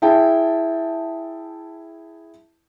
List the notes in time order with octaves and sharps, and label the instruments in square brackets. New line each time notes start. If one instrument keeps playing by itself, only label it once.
[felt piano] E4 G#4 E5 G5 A5